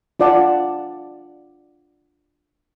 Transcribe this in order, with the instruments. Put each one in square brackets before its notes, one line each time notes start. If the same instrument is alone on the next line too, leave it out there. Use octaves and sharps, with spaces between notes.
[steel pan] D4 F4 D5 F#5 A5